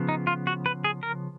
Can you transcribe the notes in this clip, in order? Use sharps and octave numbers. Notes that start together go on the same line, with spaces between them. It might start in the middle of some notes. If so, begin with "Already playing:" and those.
Already playing: C#3 F3 B3
D#4
F4
F#4
B4
G#4
A#4